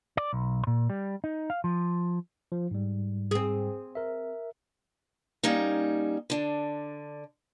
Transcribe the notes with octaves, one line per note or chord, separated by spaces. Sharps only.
D5
B1
A#2
G3
D#4
F5
F3
F3
G#2 G3
C4 G#4
A#4 E5
G3 A#3 C#4 D#4
D3 D4